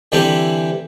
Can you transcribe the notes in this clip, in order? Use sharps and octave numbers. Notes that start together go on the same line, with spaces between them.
D3 E3 G3 C4 G4